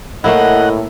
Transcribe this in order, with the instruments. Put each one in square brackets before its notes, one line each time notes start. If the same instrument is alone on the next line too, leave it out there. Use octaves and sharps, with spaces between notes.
[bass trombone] A2 [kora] A3 A#3 E4 [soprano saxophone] D#5 [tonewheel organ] F#5